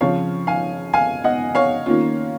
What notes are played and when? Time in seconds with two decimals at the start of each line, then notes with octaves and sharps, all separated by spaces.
0.01 C#3 F3 C4 C#5 F5
0.47 F5 G#5
0.93 F5 G#5
1.24 D#5 F#5
1.55 C#5 F5
1.86 D#3 A#3 C#4 F4